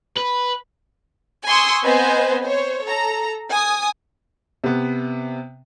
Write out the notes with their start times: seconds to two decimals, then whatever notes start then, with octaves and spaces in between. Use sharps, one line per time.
0.16 B4
1.47 G#5 C6 C#6 D#6 E6
1.83 B3 C4 B4 C5 D#5 G#5
2.43 C5 C#5
2.86 A4 A#5
3.51 G#5 D#6
4.64 C3 B3